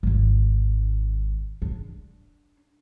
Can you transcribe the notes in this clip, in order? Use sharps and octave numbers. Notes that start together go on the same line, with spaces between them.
G#1 D#2
D4